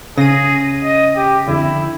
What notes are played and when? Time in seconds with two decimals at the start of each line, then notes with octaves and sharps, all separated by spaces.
0.18 C#3 G#4 A#6 D#7
0.84 D#5
1.16 G4
1.47 F2 D3 E4